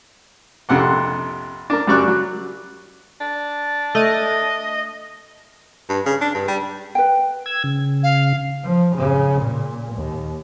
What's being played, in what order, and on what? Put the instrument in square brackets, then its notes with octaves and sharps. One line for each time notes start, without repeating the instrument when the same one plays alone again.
[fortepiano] A#1 F2 C3 F#5 C6
D4 A#4
F#2 G3 D5 C#6 F#6
F#3
[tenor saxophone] D4
[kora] A3 [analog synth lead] D#5
[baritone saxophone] G2
C#3
D4
G2
G3
[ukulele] B4 G5
[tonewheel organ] E6 G#6
C#3
[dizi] F5
[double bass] F3
C#3
A#2
D#2